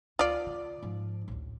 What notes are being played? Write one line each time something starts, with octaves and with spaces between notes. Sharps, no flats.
D2 F4 D5
C#3
G#2 F3
A1 D2